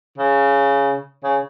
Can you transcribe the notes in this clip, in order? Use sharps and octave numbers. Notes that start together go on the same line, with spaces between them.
C#3
C#3